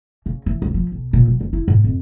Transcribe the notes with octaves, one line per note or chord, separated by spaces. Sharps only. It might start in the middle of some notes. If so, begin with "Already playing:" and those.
C#3
E3
C#2
F3
B1
A#2
F#3
F#2
E4
G#2
F2